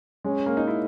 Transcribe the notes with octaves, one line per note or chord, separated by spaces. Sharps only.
G#3 C#4
A#3
D#4
E4